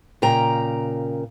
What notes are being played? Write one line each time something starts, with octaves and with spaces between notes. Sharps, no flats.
A#2 C#3 A#4 G5 A#5